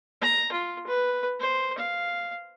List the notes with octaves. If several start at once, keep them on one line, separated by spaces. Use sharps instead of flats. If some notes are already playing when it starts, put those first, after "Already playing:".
A#5
F4
B4
C5
F5